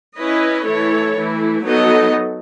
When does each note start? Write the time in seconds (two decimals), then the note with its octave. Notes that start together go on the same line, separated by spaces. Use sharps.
0.18 C#4 E4 B4 D#5
0.66 E3 A3 E4 A4 C#5
1.15 E3 A3 E4
1.64 F#3 B3 D#4 A4 D#5